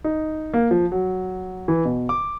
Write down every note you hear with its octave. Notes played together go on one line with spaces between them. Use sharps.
D#4
A#3
F3
F#3
E3
B2
D6